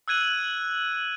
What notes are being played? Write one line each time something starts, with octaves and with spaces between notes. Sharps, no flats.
E6 F#6 G#6 D#7 F#7